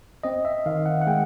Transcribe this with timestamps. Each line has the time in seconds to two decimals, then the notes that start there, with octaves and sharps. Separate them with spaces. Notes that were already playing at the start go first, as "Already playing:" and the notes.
0.23 C4 D#5
0.45 E5
0.66 D#3 F5
0.86 F#5
1.02 F#5
1.07 G#3 G5